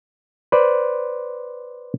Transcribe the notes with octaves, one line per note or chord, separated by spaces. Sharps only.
B4 C5 D5